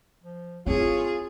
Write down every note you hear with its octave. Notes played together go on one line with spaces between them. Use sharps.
F3
C4 E4 F4 G#4 C#5